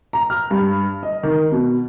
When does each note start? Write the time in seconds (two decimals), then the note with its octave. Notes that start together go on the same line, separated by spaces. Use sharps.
0.13 A#5
0.30 F6
0.51 G2
1.03 D#5
1.23 D#3
1.52 B2